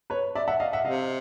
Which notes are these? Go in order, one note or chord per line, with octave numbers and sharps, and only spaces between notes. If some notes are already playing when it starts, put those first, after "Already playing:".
B4 C#5
D5 E5
E5 F#5
D#5 F5
E5 F#5
C3 D#5 F5